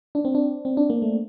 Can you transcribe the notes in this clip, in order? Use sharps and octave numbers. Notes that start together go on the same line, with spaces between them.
D4
C4
D4
C4
D4
A#3
A3